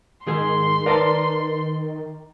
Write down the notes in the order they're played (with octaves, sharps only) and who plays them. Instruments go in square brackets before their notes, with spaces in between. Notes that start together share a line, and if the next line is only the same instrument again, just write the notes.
[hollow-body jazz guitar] G#2 G#4 G#5 [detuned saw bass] D#3 [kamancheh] C6
[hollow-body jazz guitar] A#4 B4 A5 [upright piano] D5 A#5